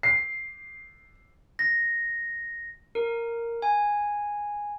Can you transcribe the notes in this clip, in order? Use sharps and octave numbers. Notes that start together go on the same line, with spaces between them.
C7
A#6
A#4
G#5